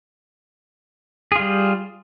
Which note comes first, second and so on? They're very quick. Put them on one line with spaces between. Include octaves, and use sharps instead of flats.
G#4 F4 G3